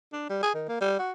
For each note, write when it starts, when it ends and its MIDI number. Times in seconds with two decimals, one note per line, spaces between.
0.13 0.26 62
0.30 0.43 55
0.43 0.51 68
0.54 0.64 51
0.68 0.80 58
0.81 0.98 55
0.99 1.12 66